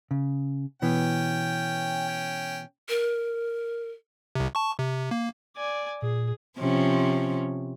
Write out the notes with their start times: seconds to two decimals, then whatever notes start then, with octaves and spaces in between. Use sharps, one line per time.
0.11 C#3
0.82 B2 E3 B3 C#4 G5
2.89 A#4
4.35 C2 C3
4.55 A5 C#6
4.79 C3
5.11 A#3
5.56 D5 G#5
6.02 A#2 G#4
6.59 C3 F3 C#4